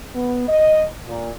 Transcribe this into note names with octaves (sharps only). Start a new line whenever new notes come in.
B3
D#5
A#2